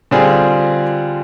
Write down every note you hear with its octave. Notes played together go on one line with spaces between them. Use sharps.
D3 G3 C4 F4 G#4